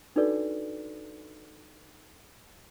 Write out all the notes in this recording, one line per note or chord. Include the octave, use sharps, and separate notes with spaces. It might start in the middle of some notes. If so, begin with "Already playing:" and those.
D4 D#4 F#4 A4 B4 D5